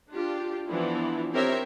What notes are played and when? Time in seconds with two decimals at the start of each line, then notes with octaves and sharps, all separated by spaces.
0.11 D4 F4 G4
0.67 E3 F3 B3 D4 E4
1.32 C4 G4 A#4 C#5 E5